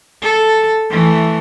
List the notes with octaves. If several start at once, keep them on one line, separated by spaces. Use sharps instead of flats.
A4
E3 A3